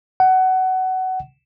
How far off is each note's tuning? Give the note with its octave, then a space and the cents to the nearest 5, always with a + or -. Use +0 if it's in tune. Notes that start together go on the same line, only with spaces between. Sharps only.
F#5 +20